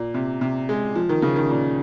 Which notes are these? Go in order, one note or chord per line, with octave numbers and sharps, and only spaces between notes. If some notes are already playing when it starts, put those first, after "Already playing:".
Already playing: A#2
C3
C3
G#3
F3
D#3
C#3
D#3
A#2